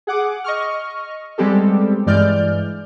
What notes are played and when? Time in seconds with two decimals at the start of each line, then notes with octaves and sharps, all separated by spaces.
0.07 G#4 F#5 D6
0.44 D#5 C#6 F6
1.38 G3 G#3 B3 C4 G4 A4
2.06 G2 E3 G#3 D5 F6 G6